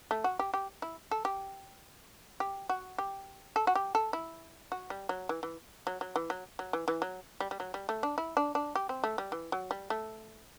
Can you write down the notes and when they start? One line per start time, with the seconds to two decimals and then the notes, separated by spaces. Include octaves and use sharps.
0.11 A3
0.24 F#4
0.39 G4
0.54 G4
0.82 E4
1.11 A4
1.25 G4
2.40 G4
2.69 F#4
2.98 G4
3.56 A4
3.67 F#4
3.75 G4
3.95 A4
4.13 E4
4.72 F#4
4.90 G3
5.09 F#3
5.29 E3
5.43 E3
5.87 F#3
6.01 F#3
6.16 E3
6.30 F#3
6.59 F#3
6.73 E3
6.88 E3
7.02 F#3
7.40 G3
7.51 G3
7.60 F#3
7.74 G3
7.89 A3
8.03 D4
8.18 E4
8.37 D4
8.55 D4
8.75 G4
8.89 C4
9.04 A3
9.18 G3
9.32 E3
9.52 F#3
9.71 G3
9.90 A3